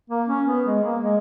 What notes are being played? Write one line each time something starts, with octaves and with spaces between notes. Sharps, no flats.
A#3
C#4
B3
G#3
A#3
G#3